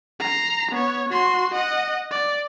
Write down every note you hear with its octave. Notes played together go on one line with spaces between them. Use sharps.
A#5 C7
B3 C#5
F#4 C6
D#5 F#5
D5